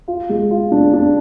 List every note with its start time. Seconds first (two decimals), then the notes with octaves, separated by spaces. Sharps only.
0.08 F4
0.29 G#3
0.51 F4
0.72 D4
0.93 D4